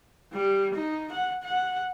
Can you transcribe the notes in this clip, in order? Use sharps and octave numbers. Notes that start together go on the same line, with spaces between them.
G3
D#4
F#5
F#5